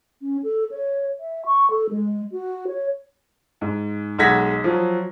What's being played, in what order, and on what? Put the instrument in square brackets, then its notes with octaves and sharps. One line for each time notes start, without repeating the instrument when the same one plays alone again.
[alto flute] C#4
A4
C#5
E5
C#6
A4
G#3
F#4
C#5
[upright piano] G#2
B1 G#3 F#5 G#6 A#6 B6
F3 F#3